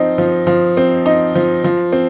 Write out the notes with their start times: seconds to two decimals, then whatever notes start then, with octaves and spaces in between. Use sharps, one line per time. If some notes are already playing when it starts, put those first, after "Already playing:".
Already playing: F3 C4 D#4
0.18 F3
0.47 F3
0.77 C4
1.06 D#4
1.35 F3
1.64 F3
1.92 C4